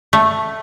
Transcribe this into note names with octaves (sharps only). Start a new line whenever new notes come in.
A3